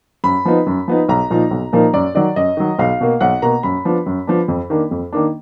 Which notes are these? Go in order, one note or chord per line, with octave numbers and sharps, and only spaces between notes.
F#2 B5
F3 B3 D#4
F#2
F3 B3 D#4
B1 A#5
A#2 F3 A#3 D#4
B1
A#2 F3 A#3 D#4
F#2 D5
D#3 F#3 D5
F#2 D#5
D#3 F#3
B1 F5
B2 A#3
B1 F#5
B2 A#3 A#5
F#2 B5
F3 B3 D4
F#2
F3 B3 D4
F2
D#3 A#3 D4
F2
D#3 A#3 D4